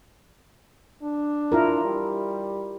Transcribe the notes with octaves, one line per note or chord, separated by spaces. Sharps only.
D4
E4 F4 A#4
G3